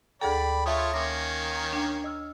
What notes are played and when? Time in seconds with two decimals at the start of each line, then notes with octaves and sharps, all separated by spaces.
0.21 D2 G#4 A4 D5 G5 B5
0.66 A3 F4 C#5 E5 C6 D#6
0.94 D#3 A#3 C#4 D6 A#6
1.73 D4 G5
2.04 D#5 E6 F6